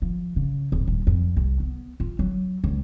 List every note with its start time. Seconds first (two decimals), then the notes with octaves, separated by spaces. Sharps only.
0.02 F3
0.36 C#3
0.72 D1
0.88 D#1
1.07 F2
1.37 C2
1.60 B3
2.00 F4
2.19 F#3
2.64 C#2